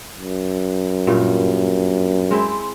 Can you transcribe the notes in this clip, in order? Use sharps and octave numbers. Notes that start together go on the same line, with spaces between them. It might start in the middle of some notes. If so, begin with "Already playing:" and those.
F#2
G2 A#2 G3
G#3 C4 E4